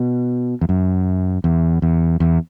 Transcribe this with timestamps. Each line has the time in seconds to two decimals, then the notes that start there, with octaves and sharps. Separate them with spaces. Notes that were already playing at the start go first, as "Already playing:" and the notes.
Already playing: B2
0.61 E2
0.69 F#2
1.44 E2
1.82 E2
2.20 E2